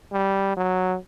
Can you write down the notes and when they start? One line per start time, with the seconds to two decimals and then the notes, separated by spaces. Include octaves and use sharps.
0.12 G3
0.57 F#3